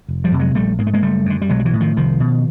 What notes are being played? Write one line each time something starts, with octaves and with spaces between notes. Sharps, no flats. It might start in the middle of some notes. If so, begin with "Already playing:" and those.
F1
F3 G3
F2 C3
F#3 G#3
A#1 G3 A3
G#2 A#3
A3
G#3 A#3
F#1 G3 A3
F#2 D3
G3
B1 F#3 G#3
G3
E3 F#3
A2
D#3 F3
C2 D#3 F3
B2